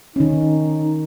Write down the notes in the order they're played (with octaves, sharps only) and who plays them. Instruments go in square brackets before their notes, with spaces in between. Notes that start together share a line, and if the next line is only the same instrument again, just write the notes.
[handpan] D#3 C#4 [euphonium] D#4